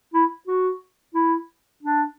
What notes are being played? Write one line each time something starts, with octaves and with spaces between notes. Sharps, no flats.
E4
F#4
E4
D4